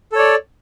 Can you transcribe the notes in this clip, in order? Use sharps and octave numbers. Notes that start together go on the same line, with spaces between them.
A4 C#5 D5